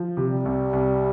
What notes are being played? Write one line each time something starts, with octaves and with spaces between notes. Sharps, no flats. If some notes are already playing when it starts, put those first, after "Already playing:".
Already playing: F3
C3
G3
C2
C2